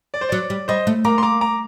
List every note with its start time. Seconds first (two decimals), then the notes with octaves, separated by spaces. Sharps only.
0.14 D5
0.21 C5
0.29 F#3 D5
0.50 G3
0.68 G3 C5 D#5
0.87 A3
1.05 A#3 A#5 D6
1.18 C6
1.23 A#5 D6
1.41 A#5 D6